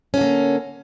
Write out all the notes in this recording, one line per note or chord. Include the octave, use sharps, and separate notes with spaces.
D3 A#3 C#4